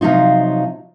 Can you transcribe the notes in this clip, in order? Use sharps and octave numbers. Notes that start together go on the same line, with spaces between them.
C3 F3 F#3 D#4 F4